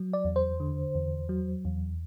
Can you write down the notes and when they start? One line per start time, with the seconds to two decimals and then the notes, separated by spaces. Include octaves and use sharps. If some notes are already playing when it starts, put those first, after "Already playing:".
Already playing: F#3
0.13 D5
0.25 E2
0.36 C5
0.60 D3
0.95 E2
1.29 F#3
1.65 E2